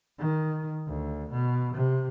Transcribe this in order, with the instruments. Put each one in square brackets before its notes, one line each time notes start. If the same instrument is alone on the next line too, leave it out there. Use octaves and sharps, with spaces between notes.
[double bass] D#3
D2
B2
C3